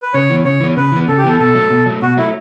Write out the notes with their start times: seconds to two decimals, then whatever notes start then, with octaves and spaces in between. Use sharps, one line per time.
0.03 B4
0.14 C#3 C#5
0.30 E3 B3
0.45 C#3 C#5
0.61 E3 B3
0.77 C#3 B4
0.92 E3 B3
1.08 C#3 A4
1.18 G4
1.24 E3 B3 A4
1.39 B2 A4
1.55 F#3 A3
1.70 B2
1.86 F#3 A3
2.02 B2 F#4
2.17 F#3 A3 E4